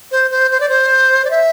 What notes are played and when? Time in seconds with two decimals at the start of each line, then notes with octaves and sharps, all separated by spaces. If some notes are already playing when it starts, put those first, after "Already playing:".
0.11 C5
0.31 C5
0.51 C5
0.60 D5
0.69 C5
1.25 D5
1.30 E5